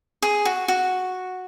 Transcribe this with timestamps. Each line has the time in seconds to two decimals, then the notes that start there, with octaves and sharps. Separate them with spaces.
0.22 G#4
0.45 F#4
0.68 F#4